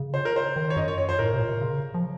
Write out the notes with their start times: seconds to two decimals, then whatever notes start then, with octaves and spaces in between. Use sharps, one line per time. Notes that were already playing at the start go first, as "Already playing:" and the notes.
Already playing: C#3
0.14 C5
0.25 A#4
0.36 C5
0.56 D#3
0.70 C#5
0.76 F#2 D#5
0.88 C#5
0.98 C#5
1.09 C5
1.19 A2 A#4
1.33 C3
1.40 A#2
1.61 C#3
1.94 F3